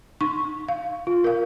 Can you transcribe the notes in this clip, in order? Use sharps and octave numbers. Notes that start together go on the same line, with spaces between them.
D#4 C#6
F5
F4
A#4 F5